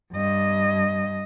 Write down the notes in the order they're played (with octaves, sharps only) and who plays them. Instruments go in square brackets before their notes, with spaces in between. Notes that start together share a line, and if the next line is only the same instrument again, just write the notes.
[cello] G2 D#5